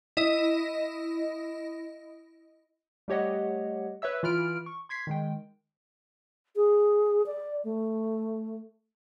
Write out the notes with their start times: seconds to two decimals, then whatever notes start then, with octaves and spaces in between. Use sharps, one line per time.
0.17 E4 D#5
3.08 G3 A3 G4 C#5 D#5 F#5
4.02 B4 C#5 E5 E6
4.23 E3 F4 B5 F6 D7
4.66 C#6
4.89 C6 G#6 B6 C7
5.07 D#3 G#3 G5
6.56 G#4
7.26 D5
7.64 A3